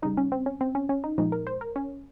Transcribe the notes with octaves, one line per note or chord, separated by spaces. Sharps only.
C#3 G3 D#4
C#4
C4
C#4
C4
C#4
C#4
D#4
A#2 F3 G#3 D#4
A#4
C5
A#4
C#4